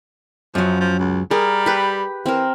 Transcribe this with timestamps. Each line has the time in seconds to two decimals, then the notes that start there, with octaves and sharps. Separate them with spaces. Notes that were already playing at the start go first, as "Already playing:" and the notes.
0.55 F#2 F3 F#3
0.80 F3
1.00 C#2
1.31 G3 G#4 A#4
1.66 G4 B4
2.26 E3 C4 A#4